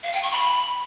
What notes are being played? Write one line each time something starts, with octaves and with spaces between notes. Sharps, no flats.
F5
G5
C#6
B5